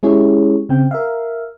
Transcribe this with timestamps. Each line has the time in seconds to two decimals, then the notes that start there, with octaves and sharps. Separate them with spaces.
0.03 G#3 C#4 E4 G4 G#4 C#5
0.69 C#3 C4 G5
0.91 A#4 E5 F5